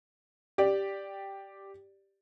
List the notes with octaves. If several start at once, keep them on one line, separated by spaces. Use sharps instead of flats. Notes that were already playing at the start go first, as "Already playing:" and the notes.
G4 D5